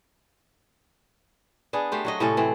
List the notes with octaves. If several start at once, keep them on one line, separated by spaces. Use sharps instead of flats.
B3 D4 G#4
A3 G4 C5
F#3 F#4 D#5
A2 C3 C#4 A4
E3 C4